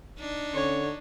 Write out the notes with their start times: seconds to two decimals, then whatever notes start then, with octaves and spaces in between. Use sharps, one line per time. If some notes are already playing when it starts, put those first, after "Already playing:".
0.18 D4 D#4
0.54 D3 C#4 C#5